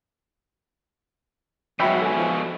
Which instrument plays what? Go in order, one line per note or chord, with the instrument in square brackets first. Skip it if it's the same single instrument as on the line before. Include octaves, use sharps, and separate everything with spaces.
[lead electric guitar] G#2 B2 [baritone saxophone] F#3 [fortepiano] E5 G5 B5
[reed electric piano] A4 G#5
[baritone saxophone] F3